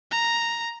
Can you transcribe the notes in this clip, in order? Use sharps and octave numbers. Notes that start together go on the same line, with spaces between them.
A#5